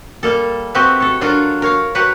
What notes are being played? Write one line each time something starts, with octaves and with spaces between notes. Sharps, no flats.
G3 A#3 A4
C4 F#4 G4 B4 D#5 E5
A4 C#5
F#3 D4 F4 F#4 A4 A#4
A#4 C#5 F5
F#3 F#4 G4 B4 F#5 A#5